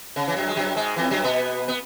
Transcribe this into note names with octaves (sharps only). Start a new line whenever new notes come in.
C#3
E3
F#2 F#3
G#3
F#2 F#3
G#2 G#3
E2 E3
F#2 F#3
B2 B3
B3